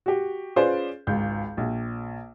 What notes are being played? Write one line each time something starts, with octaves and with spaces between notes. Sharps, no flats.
F#4 G4
C#4 F4 G#4 B4 C5 D5
G#1 C#2 G6
A#1